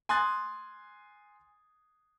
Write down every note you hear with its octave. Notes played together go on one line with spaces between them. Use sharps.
G#5 C6 D#6 F#6 A6